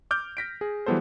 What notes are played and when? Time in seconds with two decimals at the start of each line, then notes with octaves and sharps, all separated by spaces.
0.11 D6 F6 G6
0.37 A#6 B6 D7
0.61 G#4
0.86 E3 F#3 G3 B3 A4 C5